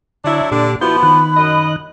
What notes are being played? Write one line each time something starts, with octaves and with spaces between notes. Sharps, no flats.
D3 F#3 D4 E4
A#2 D3 D4 G4
F3 B3 E4 F#4 B5 G6
D#3 F#6
F#2 D#5